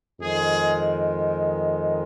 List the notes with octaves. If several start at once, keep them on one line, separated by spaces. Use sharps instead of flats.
F2 D#3 G#3 G#4